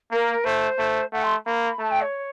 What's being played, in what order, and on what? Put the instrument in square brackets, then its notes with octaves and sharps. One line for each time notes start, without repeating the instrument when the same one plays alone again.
[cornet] A#3 [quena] A#4
[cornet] A3 [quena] C5
[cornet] A3
[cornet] A3 [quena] F#5
[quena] C6
[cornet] A#3 [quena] B5
[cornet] A3 [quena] A5
[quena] G5
C#5